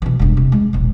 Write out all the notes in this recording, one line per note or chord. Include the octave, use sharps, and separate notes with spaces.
B2 E3
E1 G2
C3
G#3
E1 A#1